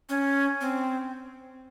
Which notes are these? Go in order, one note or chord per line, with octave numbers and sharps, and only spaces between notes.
C#4
C4